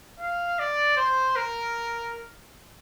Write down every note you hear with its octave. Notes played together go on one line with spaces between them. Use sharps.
F5
D5
C5
A#4